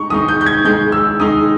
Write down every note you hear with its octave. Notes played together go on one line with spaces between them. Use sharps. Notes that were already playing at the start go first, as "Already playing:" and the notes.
Already playing: G#3 D#4 C#6
D#3 G#3 D#4 D#6
G6
G6
G#6
D#3 G#3 D#4 G6
E6
D#3 G#3 D#4 D#6